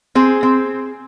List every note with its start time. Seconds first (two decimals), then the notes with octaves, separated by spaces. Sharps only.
0.15 C4 G#4
0.43 C4